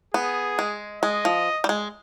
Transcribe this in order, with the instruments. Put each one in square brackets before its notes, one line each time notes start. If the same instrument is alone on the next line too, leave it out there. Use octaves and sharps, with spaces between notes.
[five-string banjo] B3 [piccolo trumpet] G#4
[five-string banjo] G#3
[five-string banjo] G#3 [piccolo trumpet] D#5
[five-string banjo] F3
G3
G#3